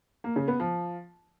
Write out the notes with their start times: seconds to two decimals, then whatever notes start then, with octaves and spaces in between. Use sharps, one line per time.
0.24 A#3
0.36 C#3
0.48 B3
0.60 F3